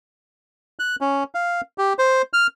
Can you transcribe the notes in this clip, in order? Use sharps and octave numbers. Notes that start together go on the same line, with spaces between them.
F#6
C#4
F5
G4
C5
F6